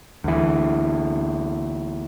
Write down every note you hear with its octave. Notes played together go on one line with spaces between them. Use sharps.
D2 E3